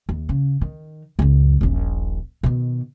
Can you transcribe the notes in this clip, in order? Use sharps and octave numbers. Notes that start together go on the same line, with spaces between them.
D#2
C#3
D#3
C#2 F#2
D#1 A#1
B2 D#3